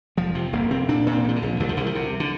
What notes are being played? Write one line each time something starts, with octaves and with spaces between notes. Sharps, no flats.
F1 F3
C3 F3
F1 A#3
C3 C4
A#2 D4
A#2
C4
A#1 F3
D3
A#1
C2 G3
F3
C2 D3
F3
C3
D3